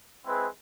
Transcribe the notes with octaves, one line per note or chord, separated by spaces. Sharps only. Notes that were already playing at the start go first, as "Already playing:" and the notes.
G#3 C4 E4 G#4 B4